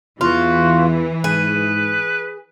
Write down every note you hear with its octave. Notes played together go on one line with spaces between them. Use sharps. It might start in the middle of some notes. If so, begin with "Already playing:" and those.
E2 E3 F4 F#4
G#2 G#4 B4